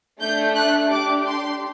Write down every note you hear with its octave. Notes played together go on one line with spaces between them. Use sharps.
A3 D4 A4 G6
F#6
D4 G4 D6
C6